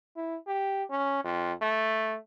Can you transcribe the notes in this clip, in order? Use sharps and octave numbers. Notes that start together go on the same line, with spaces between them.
E4
G4
C#4
F2
A3